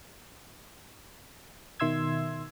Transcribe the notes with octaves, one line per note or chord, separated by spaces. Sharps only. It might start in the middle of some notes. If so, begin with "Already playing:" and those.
B2 D#3 E5 C6 E6 G#6